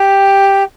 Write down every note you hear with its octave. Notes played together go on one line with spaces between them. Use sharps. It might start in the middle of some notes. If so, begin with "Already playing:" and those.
Already playing: G4